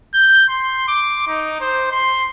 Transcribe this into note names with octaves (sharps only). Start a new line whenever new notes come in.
G6
C6
D6
D#4
C5
C6